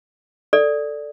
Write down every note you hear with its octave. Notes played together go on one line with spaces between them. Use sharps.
A4 D5